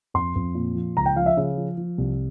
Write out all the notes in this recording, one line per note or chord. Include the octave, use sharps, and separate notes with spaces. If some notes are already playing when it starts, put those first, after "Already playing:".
F2 C6
F2
A#2
F3
C#2 A#5
G5
F3 F5
E5
C#3
F3
F3
C2